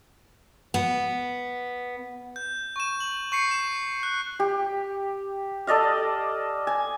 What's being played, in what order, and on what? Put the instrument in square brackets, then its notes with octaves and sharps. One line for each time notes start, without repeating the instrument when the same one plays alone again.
[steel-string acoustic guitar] B3
[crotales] G6
C#6 E7
F#7
C#6 G6 C7 C#7
E7
F#6
[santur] G4
A4 D5 D#5 F5
G#5